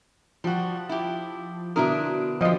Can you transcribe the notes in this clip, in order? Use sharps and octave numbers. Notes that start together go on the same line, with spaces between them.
F3 G3 F#4
E4 G4
B2 D3 D4 E4 A#4 D#6
F3 G3 G#3 D#5